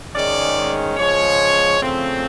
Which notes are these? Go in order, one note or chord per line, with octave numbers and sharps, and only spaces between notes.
G#2 D#3 G#3 C#4 D5
C#3 F3 G#3 C#5
C#3 F3 A3 C4